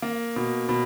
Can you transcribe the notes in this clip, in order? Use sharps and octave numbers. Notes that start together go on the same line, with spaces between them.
A#3
B2
B2